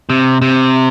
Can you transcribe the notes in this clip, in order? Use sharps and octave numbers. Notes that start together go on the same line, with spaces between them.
C3
C3